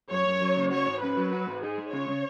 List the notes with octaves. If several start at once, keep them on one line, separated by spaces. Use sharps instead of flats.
F#2 C#5
F#2
F#3
C#3
F#4 C#5
G#2
C#4 B4
F#3
F#4
G#2
D#4 G#4
G#3
C#3 C#5
C#3